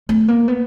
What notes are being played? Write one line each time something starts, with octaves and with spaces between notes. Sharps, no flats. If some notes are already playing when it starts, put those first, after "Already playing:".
A3
A#3
B3